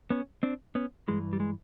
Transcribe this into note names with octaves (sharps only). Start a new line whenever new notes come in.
B3 C#4
C4 D4
B3 C#4
G2 E3 G#3
G3
G#3